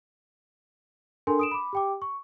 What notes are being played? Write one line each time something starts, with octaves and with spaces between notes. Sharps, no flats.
D4 A4 A#4 G#5 C6
D#6 D7 E7
B5 D6
G4 G5 D6
C#6